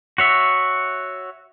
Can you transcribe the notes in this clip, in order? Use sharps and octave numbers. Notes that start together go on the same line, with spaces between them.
F#4 C#5 E5